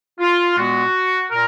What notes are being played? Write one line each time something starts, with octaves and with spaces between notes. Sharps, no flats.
F4
A#2 G#3 B3 F#4
A#2 A#4